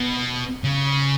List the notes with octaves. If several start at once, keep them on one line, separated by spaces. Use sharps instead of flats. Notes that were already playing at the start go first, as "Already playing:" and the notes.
Already playing: B2
C#3